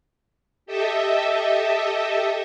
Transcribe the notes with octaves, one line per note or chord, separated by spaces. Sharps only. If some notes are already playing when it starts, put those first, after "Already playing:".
G4 A4 D#5 E5